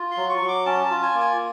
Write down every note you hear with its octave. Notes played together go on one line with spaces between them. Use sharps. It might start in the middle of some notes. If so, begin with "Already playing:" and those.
Already playing: F4
C6
F#3
C#6
F#3
D6
C#4 A5
A5
F4
G#5
A#3
G#5